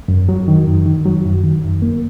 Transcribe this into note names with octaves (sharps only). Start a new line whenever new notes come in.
F#2
F#3
D#3
F#2
D#3
F#3
F#2
D#3
F#2
A#3